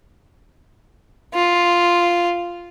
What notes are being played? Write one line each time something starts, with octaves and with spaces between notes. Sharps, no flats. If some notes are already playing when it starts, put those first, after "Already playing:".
F4